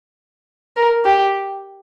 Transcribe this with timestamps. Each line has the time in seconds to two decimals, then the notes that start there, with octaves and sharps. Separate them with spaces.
0.76 A#4
1.05 G4